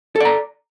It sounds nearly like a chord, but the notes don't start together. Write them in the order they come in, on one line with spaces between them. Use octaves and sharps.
A4 D5 A#5